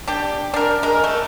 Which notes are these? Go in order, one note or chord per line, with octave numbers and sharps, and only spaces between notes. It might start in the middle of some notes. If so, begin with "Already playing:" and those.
D4 G4
D4 A#4
G#3 A#4
A3